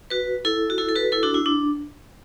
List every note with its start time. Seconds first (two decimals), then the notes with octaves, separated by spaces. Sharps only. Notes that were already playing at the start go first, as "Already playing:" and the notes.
0.10 F#4 B4
0.45 E4 A4
0.70 F#4
0.78 E4 A4
0.89 A4
0.96 F#4 B4
1.12 E4 A4
1.23 D4 F#4
1.34 E4
1.46 D4